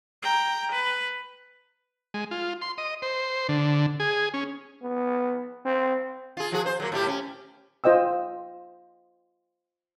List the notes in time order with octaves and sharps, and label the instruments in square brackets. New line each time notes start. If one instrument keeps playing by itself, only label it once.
[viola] G5 A#5
B4
[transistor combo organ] G#3
F4
C6
D#5
C5
D3
G#4
C#4
[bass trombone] B3
C4
[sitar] F4 G#4
F3 F#4 G#4
C5
F#3 A#3
A2 A3 G4
C#4
[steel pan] F4 C5 D#5 G5 E6